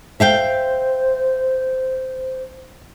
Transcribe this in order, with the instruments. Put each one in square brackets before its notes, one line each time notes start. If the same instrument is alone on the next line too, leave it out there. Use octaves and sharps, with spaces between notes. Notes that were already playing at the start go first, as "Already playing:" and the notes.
[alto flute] C5 [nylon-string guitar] E5 F5 G5